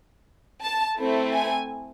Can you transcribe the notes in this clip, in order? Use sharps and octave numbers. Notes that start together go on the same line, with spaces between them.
A5
A3 C4 E4 A4
G#5